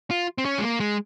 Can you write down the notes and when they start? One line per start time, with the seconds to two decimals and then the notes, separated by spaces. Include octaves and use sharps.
0.11 F4
0.38 C4
0.45 C#4
0.59 G#3
0.62 A#3
0.80 G#3